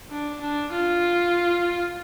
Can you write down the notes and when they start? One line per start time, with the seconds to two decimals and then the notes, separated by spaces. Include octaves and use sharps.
0.11 D4
0.41 D4
0.72 F4